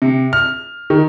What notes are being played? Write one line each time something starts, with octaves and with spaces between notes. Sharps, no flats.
C3
F6
D#3